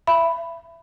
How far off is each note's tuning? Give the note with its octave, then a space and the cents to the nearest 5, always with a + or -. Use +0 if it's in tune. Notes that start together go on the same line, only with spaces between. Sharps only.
E5 +25 B5 +0